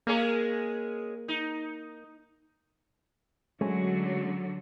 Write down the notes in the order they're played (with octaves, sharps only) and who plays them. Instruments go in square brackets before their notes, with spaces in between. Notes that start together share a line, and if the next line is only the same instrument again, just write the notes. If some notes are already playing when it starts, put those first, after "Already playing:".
[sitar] G#3 C#4 G#4 [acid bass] A#3
[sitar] D#4
[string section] D3 F#3 [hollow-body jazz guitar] G#3 A3 C#4